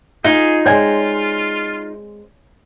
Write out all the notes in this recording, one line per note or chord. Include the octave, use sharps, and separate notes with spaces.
D#4 F4 G#4
G#3 C4 F4 C#5 D5 G#5